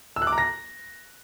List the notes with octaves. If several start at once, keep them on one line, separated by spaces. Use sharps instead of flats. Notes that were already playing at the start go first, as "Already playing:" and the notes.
E6
F#6
D6
A#5
A#6